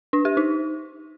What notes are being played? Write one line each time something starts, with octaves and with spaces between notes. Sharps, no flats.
D4
G4
D#4